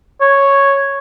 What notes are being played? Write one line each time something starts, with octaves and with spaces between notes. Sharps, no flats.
C#5